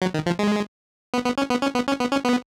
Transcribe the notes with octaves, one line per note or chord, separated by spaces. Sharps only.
F#3
D#3
F3
G#3
B3
B3
C#4
B3
C#4
B3
C#4
B3
C#4
B3